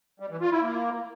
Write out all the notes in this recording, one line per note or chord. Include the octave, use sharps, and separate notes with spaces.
G3
E3
F4
E4
A#3